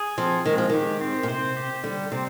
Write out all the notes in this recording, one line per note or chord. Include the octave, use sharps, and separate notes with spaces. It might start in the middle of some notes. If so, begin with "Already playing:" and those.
Already playing: G#4
F3 C4
D#3 G#3
F3
D#3 G4
C4
A#2
C3 C5
G4
D3 G3
C3 C4